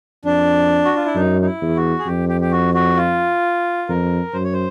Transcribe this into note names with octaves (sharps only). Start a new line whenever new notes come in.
F2 D4
F#4
F4
E4
F#2 D#4
D#4
E4
E2
F#4
G#4
F2 G4
G4
G4
F#4
F#4
F4
F2 A#4
F#2 C5
C#5
C5